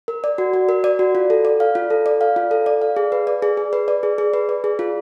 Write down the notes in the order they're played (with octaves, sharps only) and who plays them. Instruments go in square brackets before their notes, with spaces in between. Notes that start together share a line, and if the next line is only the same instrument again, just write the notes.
[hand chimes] A#4
D5
F#4
F#4
A#4
D5
F#4
F4
A4
D5
F5
F4
A4
D5
F5
F4
A4
D5
F5
G#4
B4
D5
G#4
G#4
B4
D5
G#4
G#4
B4
D5
G#4
F4